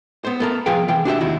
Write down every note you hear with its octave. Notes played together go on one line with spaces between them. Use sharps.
B3 C5
B3 A4 A#4
C2 F3 G#4 B4 F5 G5
C3 E3 G5
D4 F#4 G4 E5
D#2 C3 E4 F#4